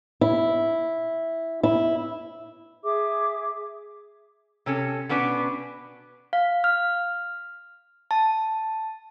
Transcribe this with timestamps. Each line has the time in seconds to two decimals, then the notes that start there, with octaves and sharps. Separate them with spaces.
0.21 E4
1.63 E4
2.84 G#4 E5 D6
4.66 C3 C#4 A4
5.09 B2 B3 C#4 D4 B4
6.33 F5
6.64 F6
8.11 A5